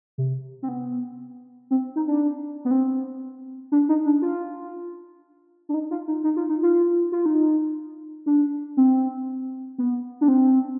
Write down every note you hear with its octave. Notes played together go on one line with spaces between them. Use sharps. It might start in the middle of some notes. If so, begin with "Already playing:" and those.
C3
C4
B3
C4
D#4
D4
B3
C4
D4
D#4
D4
F4
D4
D#4
F4
D#4
D#4
F4
D#4
F4
F4
D#4
D4
C4
B3
D4
C4